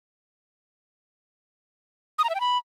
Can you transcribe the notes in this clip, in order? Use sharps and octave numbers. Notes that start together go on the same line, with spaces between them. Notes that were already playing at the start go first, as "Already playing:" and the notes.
D#6
A#5
E5
G5
B5